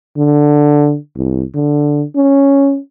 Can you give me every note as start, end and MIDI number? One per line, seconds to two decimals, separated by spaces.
0.18 0.97 50
1.16 1.43 36
1.54 2.04 50
2.16 2.79 61